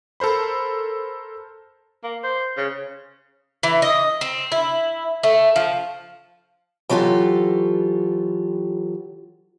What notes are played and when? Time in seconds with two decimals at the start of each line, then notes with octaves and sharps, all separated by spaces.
0.20 A4 A#4 C5 B5
2.04 A#3
2.24 C5
2.57 C#3
3.63 E3
3.82 D#5
4.21 C4
4.52 E4
5.23 A3
5.56 F3
6.90 E3 F#3 F4 G4 A4